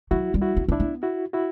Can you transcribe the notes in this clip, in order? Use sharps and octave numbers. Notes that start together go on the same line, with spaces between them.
F#3 E4 F#4
G3
E4 F#4
A#3
A#3 D4 E4
B3
E4 F#4
E4 F#4